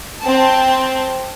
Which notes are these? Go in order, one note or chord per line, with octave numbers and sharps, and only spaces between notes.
C4 A5